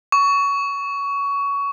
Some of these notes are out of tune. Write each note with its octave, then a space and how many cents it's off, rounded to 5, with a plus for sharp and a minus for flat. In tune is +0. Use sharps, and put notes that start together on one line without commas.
C#6 +20